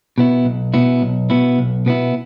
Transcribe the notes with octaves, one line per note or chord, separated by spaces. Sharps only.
B2 B3 E4
B1
B2 B3 E4
B1
B2 B3 E4
B1
B2 B3 E4